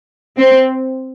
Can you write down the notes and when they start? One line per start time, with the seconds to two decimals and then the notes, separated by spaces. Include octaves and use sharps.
0.38 C4